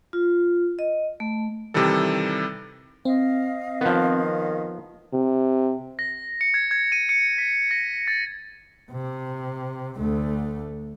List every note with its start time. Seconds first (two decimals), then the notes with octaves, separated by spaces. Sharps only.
0.13 F4
0.79 D#5
1.20 A3
1.74 C3 D#3 E3 G3 A4
3.05 C4 D#5 F5
3.81 D#3 F3 B3
5.13 C3
5.99 A#6
6.41 C#7
6.54 G#6
6.71 G#6
6.92 D#7
7.09 C#7
7.38 B6
7.71 A#6
8.08 A6
8.91 C3
9.98 D2 A3